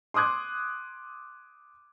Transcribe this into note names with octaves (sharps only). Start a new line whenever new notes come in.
C6 D6 D#6 F#6 G#6